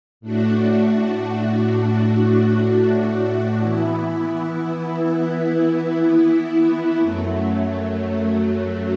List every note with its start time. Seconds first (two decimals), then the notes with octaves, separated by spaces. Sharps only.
0.21 A2 A3 D4 F#4
3.59 E3 B3 E4
6.99 F#2 F#3 A3